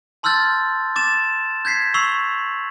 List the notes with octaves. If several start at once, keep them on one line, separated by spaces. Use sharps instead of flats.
A5 C6 E6 F6 G6 A6
D6 A6 E7
G6 G#6 B6 C7
C#6 E6 C7 F7 F#7